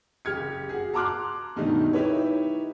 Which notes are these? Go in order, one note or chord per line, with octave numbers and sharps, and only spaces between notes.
F#1 G4 F6 G#6 C#7
F#4 G#4
A5 A#5 C6 D6 F6 F#6
G2 B2 D#3 G3 A3 D#4
D#4 E4 G4 B4 C#5